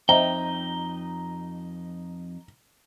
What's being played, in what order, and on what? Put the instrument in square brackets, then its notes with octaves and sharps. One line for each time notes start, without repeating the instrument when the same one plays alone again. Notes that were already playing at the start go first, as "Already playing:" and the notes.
[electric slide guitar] F2 D#4 [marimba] C5 D#5 E5 [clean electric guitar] G5 [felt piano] A#5